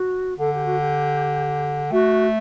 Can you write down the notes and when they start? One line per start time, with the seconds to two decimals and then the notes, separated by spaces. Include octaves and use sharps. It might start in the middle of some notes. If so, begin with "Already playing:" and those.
Already playing: F#4
0.39 D3 A4
0.53 G4
0.65 F#4
0.79 G4
1.91 A3 F#4